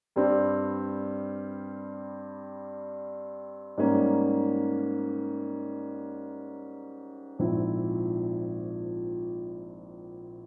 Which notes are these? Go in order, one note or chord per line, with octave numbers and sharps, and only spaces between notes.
G2 G3 C4
G#2 G3 A#3 C#4
A#1 G#2 F3 C4 E4